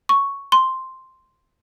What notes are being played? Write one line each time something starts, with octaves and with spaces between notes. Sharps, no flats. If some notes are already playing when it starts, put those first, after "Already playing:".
C#6
C6